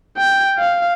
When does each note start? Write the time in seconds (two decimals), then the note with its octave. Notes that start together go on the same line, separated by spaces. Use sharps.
0.17 G5
0.59 F5